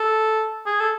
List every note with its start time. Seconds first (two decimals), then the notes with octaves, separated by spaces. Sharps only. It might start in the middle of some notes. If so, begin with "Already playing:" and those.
Already playing: A4
0.66 G#4
0.80 A4